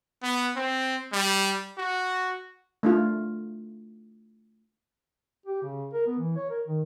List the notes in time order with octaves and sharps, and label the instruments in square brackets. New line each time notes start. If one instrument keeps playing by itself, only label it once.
[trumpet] B3
C4
G3
F#4
[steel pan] A3 D4 F4
[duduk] G4
C#3
A#4
B3
E3
C#5
A#4
D#3